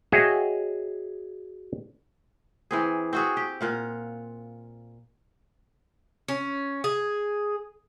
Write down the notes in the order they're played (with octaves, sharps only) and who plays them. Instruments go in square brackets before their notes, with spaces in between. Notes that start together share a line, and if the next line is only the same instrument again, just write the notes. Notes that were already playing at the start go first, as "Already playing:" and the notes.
[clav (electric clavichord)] F#4 G#4 C#5 D#5 E5 G5
[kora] E3 C4 G#4
C4 F#4 G#4
G4
A#2 F4 F#5
[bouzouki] C#4
G#4